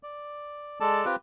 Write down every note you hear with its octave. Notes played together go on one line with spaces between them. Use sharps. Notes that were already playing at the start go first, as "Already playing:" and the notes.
D5
G#3 A4 D5 A5
C4 F4 G4 B4